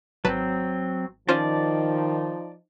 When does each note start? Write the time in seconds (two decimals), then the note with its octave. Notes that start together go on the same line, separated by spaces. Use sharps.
0.25 G#1 F#3 C4 B4 A5
1.29 D#3 F3 C#4 D#4 F4 C5 D5 A5